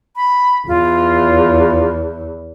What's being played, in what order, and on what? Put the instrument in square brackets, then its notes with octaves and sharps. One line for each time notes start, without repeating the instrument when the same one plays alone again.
[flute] B5
[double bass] E2 [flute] F4